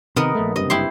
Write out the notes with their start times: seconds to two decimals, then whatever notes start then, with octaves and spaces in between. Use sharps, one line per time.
0.16 C3 D#3 B3 A#4 D#5
0.35 A#1 A3
0.56 F#1 G2 C3 D#5
0.70 E4 G4 C6